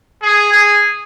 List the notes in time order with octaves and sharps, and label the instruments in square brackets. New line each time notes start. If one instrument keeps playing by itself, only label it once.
[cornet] G#4
G#4